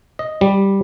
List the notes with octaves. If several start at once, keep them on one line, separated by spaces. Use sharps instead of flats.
D#5
G3